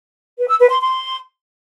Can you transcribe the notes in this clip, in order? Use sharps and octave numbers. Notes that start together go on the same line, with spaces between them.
B4
E6
B4
C6
C6